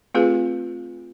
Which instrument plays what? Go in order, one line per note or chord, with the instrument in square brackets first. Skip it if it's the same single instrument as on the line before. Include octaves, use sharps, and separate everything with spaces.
[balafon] A3 C4 F4 G4 G#4 B4